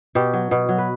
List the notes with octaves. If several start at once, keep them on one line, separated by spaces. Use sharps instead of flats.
B2 G4
F#3
B2
F#3
B4